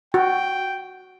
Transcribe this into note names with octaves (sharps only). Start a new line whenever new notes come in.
F#4 G5